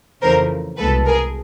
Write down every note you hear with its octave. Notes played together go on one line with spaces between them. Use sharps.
F2 C#3 E3 A3 A#4 C5
C2 B2 G#3 A4 B4
G#4 A#4